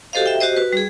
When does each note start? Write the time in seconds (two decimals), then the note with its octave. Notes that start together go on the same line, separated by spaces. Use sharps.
0.13 F#4 G4 A4 C5 D#5 F5
0.26 E5 G5
0.40 F#4 G4 C5 D#5
0.56 F#4 B4
0.73 G3 G#4